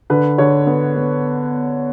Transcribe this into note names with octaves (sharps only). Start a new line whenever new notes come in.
D3 B4
D3 C#5
B3
B3